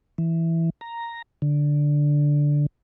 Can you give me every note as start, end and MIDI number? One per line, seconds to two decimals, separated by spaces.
0.18 0.70 52
0.81 1.22 82
1.42 2.66 50